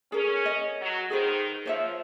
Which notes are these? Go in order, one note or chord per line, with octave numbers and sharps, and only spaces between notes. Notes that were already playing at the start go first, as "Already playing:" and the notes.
C#4 G#4 A#4
D#5
F#3
D#3 G#4 B4 C5
F3 C5 C#5 E5